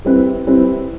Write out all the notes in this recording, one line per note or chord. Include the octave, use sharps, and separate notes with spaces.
G3 C4 E4 B4
G3 C4 E4 B4